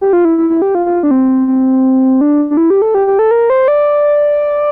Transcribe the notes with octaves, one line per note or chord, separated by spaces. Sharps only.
G4
F4
E4
E4
E4
G4
F4
F4
D4
C4
C4
D4
D4
E4
G4
A4
G4
G4
A4
A#4
C5
D5